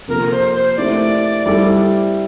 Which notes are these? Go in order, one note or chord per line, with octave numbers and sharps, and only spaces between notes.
C3 F3 A#3 F4 A4 A#4
C5
C5
A3 C4 E4 G4 A#4 D5
G3 C4 E4 A4